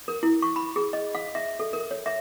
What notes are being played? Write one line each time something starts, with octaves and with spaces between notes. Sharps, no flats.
A#4
E4
C#6
B5
G#4
D#5
F5
E5
A4
A#4
C#5
E5